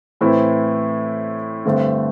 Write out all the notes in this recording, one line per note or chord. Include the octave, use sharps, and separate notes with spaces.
A2 E3 C4 E4
G2 D3 A3 C4